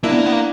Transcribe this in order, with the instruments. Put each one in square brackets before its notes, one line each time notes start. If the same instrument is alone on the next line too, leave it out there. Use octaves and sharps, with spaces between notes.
[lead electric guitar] A#3 [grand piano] D4 E4
[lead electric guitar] B3
A#3
B3
A#3